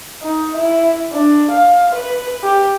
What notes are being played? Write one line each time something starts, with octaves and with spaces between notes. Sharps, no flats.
D#4
E4
D4
F5
B4
G4